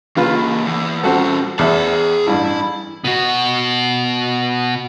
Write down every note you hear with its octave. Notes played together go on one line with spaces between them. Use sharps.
C#3 E3 A#3 F4 B4
E2
G3 C4 C#4 F#4 A4
E2 G#4 E5 A5
A1 G2 E4
B2 F#4